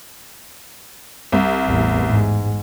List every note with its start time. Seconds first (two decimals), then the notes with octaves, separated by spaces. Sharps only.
1.32 C2
1.66 A1 E2
2.08 G#2